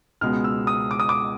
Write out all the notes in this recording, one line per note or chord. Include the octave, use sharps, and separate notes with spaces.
C#2 B2 G#3 B3 F6
E6
D#6
D6
D#6
D6